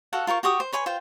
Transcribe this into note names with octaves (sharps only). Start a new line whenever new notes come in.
F#4 A4 F5 F#5
F4 A#4 C5 C#6
F#4 G4 C#6 D#6
C5
B4 C#5 G#5 C6
F4 C5 G5